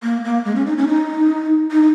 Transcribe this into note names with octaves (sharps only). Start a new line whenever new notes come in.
A#3
A#3
G#3
C#4
D#4
C#4
D#4
D#4